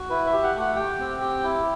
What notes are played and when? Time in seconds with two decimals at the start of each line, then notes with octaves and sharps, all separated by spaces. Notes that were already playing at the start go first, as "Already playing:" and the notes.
Already playing: F#4
0.10 E4 B4
0.26 E5
0.32 G4
0.43 F#5
0.55 A3
0.60 F#5
0.76 G4 G5
0.99 C4
1.21 G4
1.43 E4